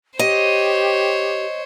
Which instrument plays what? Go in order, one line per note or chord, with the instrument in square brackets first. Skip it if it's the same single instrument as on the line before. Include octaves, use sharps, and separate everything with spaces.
[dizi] G4 [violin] C5 C#5 [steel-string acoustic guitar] D#5